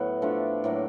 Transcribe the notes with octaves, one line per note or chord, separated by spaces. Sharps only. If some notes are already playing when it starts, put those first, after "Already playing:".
Already playing: A2 F#3 B3
F3 A3 D4
A2 F#3 A#3